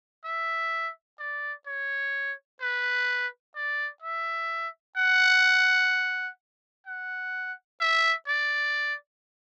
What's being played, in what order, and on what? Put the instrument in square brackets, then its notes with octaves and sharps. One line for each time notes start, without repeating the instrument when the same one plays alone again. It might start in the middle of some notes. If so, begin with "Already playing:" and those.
[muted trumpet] E5
D5
C#5
B4
D5
E5
F#5
F#5
E5
D5